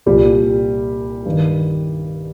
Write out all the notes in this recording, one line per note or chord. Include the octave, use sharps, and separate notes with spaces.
C2 A#2 F3 G3
G2 D#3